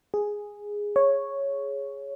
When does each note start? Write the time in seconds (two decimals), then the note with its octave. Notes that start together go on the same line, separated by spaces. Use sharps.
0.14 G#4
0.96 C#5